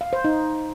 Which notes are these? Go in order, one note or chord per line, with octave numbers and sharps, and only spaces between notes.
F5
C5
D#4